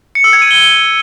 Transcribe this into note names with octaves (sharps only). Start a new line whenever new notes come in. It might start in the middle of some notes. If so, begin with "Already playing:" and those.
C#7
E6
G#6
D#7
G7